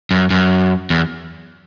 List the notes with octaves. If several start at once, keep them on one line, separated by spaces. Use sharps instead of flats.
F#2
F#2
E2